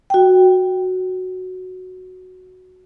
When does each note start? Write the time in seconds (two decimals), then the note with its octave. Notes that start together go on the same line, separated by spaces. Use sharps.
0.10 F#4 G5